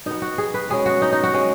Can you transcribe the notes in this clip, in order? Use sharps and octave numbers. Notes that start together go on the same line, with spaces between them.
B2 B3 D#4
F#4
G#4
B4
B2 G#3 C#4 G#4
F#4
D#4
D#4
F#4
G#3 C#4